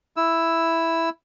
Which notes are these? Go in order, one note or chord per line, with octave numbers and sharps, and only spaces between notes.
E4 E6